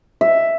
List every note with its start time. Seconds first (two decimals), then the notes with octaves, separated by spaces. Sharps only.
0.21 E5